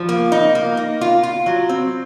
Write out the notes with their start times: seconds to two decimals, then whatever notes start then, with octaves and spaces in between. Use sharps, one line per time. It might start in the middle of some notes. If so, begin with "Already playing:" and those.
Already playing: F3
0.09 A#3
0.32 D#4
0.55 A#3
0.77 A#3
1.01 F4
1.23 F4
1.46 F#3
1.69 C4